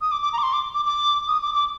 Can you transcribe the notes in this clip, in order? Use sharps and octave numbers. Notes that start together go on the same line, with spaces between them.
D#6
D6
D6
A#5
D6
C6
D6
D6
D6
D#6
D6
D6